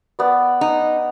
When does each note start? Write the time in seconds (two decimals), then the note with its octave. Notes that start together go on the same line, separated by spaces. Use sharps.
0.19 B3 D5
0.61 D#4